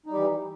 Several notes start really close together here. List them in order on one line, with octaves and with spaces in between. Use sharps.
D#4 G3 G4 E3